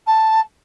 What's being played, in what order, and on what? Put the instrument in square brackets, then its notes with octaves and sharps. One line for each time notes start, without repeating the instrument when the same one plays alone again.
[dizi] A5